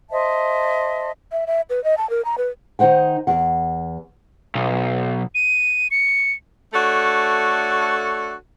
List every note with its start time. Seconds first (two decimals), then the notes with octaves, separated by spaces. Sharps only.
0.10 C5 D#5 E5 A5
1.32 E5
1.47 E5
1.70 B4
1.84 D#5
1.97 A5
2.10 A#4
2.25 A#5
2.38 B4
2.79 D#3 D#4 C5 F#5 G5
3.27 E2 F#5
4.55 B1
5.35 D#7
5.91 C#7
6.73 A3 D4 F#4 A4 C#5